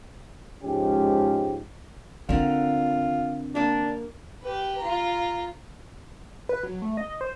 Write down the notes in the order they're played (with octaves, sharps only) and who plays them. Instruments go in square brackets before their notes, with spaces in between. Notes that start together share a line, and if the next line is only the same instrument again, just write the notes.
[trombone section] G#2 F3 G#3 C#4 G4
[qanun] D3 A#4 [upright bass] C4 [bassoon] F4
[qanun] A#3 A#4 [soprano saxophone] D4
[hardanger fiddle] G4 B4
F4 A#5
[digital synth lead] B4
F#3
A3
D#5
C5